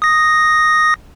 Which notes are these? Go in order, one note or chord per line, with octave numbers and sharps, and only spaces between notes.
D#6 A#6